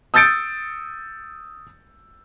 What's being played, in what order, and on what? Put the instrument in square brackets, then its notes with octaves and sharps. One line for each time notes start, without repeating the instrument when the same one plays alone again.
[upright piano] D#6 E6 G6 A6 C#7 D7